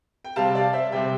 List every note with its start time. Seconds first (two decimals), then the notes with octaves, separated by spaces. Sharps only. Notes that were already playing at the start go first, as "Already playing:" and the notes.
0.24 G5
0.36 C3 G3 C4 F5 A5
0.55 D5 F5
0.73 C5 E5
0.92 C3 G3 C4 E5 G5